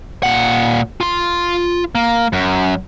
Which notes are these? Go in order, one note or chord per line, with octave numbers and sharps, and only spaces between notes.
A#2 F#5
F4 C6
A#3
F#2